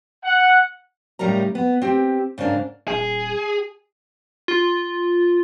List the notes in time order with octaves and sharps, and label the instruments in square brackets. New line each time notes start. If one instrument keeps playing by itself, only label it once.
[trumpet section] F#5
[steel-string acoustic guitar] A2 C#3 G3 D#4 A#4 A#5
B3
C4 G4
G#2 C#3 G#3 D4 A#4
[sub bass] D#1 [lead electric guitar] G#4
[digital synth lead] F4